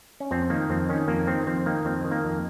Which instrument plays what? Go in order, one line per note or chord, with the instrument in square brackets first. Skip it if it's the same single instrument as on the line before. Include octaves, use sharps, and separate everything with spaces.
[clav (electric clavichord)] C#4
F2 C4
D#3 A#3
F2 C4
D#3 C#4
F2 A#3
D#3 C4
F2 C4
D#3 A#3
F2 C4
D#3
A#3
F2